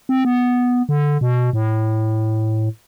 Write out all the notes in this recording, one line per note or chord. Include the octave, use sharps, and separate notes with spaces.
C4
B3
D3
B2
A2